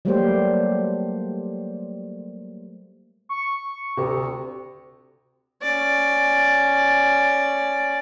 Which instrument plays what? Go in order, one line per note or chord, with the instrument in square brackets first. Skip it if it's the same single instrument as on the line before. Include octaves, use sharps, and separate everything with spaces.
[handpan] F#3 G3 A3 A#3 G4 C5
[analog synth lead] C#6
[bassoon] D2 [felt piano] C3
[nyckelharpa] C#4 D5